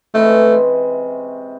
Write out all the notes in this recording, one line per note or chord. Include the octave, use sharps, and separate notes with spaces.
C3 E3 G#3 A3 C#4